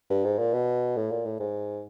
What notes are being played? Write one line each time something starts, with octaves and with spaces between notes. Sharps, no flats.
G2
G#2
A#2
B2
A2
A#2
A2
G#2